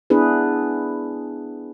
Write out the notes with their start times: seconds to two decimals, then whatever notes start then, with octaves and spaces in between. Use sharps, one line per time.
0.10 B3 D4 E4 G#4 B4